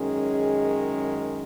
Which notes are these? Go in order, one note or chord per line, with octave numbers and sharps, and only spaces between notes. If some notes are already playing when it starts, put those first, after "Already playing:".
Already playing: F#2 D#3 G#3 C#4 G#4